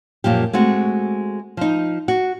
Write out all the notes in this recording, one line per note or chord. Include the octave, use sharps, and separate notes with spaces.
F#2 A#2 F3 G4
G#3 A3 C4 F#4
F3 D#4
F#4